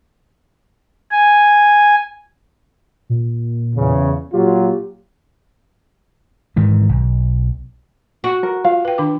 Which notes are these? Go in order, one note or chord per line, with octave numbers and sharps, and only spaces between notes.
G#5
A#2
E2 C#3
A#2 F#3 F4 G4
G#2 D#3 E3
B1
F#4
A#4
F4 F5
B4 G5
D#3 D4 D6